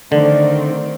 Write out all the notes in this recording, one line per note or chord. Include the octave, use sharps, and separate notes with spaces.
D3 D#3 A3 C4 D5